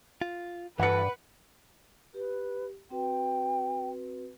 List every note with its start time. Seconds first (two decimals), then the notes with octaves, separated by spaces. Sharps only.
0.21 F4
0.80 G2 E3 F#4 A4 B4 F#5 C#7
2.14 G4 B4
2.90 C4 F#4 B4 G5